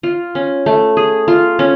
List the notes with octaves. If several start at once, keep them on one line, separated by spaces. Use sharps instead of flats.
F4
C#4
A3
G#4
F4
C#4